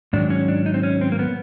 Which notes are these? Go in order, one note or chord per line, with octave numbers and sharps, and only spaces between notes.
G#2 D#3 F#3 D4
C#4
D4
D#4
C4
C#4
C4
A#3
B3